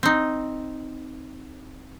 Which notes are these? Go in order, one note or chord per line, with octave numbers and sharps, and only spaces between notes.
C4 D#4